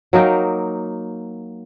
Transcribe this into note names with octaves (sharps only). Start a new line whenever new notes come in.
F#3 A#3 D#4 G5